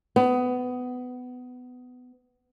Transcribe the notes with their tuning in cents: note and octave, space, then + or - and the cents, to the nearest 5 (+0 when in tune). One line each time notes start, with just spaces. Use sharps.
B3 +20